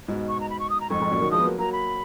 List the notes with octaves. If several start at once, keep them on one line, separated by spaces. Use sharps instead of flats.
G#2 B2
C#6
A#5
B5
C#6
D#6
A#5
F2 G#2 C#6
F2 G#2
F#2 A#2
D#3 F#3
F3 G#3 D#6
B3
F#3 A#3
F#3 A#3 A#5
B5